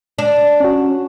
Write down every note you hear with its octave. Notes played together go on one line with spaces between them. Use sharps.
D4
C#4 F#4